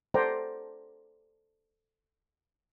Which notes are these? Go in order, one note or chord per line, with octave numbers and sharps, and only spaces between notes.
A4 C5 D5 F#5 G5 A#5